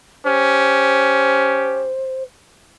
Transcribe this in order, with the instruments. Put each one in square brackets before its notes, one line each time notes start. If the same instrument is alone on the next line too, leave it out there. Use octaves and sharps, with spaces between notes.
[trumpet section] C#4 G4 [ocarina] C5